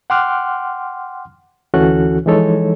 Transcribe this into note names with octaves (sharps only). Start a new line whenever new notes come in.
F#5 G5 C6 D6 F6 F#6
D2 E3 C#4 F#4 A4 F#6
E3 F3 G#3 D#4 A4 C#5